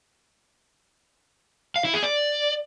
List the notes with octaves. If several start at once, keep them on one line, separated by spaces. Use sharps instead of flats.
F5
E4
G#4
D5